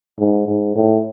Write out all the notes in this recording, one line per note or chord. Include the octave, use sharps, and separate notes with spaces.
G#2
G#2
A2